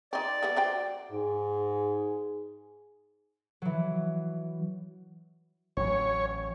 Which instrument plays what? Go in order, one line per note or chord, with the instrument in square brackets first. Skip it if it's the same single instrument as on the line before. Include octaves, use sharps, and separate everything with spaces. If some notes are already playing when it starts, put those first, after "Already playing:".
[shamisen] C4 D#4 [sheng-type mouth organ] D5
[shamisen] G3 B3 E4
F#3 C5 G5
[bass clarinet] G#2 [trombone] G#4
[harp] E3 F#3
[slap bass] A1 A2 F#3 [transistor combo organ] C#5